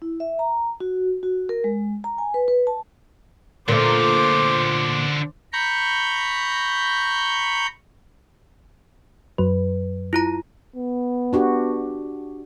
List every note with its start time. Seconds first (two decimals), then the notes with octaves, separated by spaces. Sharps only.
0.02 E4
0.20 E5
0.39 A#5
0.80 F#4
1.23 F#4
1.49 A#4
1.64 G#3
2.04 A#5
2.18 G#5
2.34 B4
2.48 B4
2.67 A5
3.68 A#2 D3 A3 F4 C5 D6
5.53 A#5 B5 C#6 G6
9.38 F#2 F#3 B4
10.13 E4 F4 A#5
10.76 B3
11.33 D4 F#4 G4